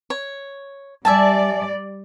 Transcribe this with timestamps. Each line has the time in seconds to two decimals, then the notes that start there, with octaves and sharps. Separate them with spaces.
0.10 C#5
1.05 G3 D5 E5 G#5 A5